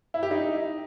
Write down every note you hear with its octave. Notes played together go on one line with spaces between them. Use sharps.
E4
G4
D#4